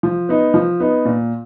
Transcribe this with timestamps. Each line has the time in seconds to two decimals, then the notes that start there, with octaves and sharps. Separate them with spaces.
0.03 F3
0.29 B3 D#4
0.54 F3
0.80 B3 D#4
1.05 A#2